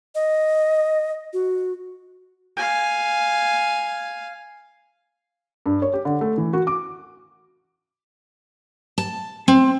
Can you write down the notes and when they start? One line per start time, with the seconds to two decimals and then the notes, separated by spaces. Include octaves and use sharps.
0.15 D#5
1.33 F#4
2.56 F5 G#5
5.66 G2
5.82 C#5
5.93 G4
6.05 D3
6.21 A3
6.38 E3
6.53 F#4
6.67 D6
8.98 A5
9.48 C4